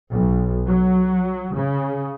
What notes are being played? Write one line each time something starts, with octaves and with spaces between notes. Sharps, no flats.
B1
F#3
C#3